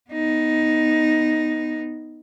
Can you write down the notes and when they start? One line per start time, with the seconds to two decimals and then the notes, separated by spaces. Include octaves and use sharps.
0.11 B3 D#4